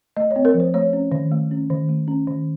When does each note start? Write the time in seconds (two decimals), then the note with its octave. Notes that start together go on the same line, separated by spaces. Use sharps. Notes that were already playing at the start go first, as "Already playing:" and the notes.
0.16 A3 D#5
0.31 C#5
0.36 C4
0.45 A#4
0.54 F3
0.60 C5
0.74 A3 C#5
0.93 C#4
1.12 D#3
1.32 A3
1.51 C#4
1.70 D#3
1.89 A3
2.08 C#4
2.27 D#3